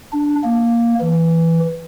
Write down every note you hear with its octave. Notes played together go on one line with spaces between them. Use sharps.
D4
A#3
E3